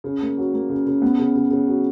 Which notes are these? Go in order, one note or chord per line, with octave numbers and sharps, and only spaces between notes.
C#3
A#3
F#3
A#3
C#3
C#3
B3
C#3
C#3
C#3
F#3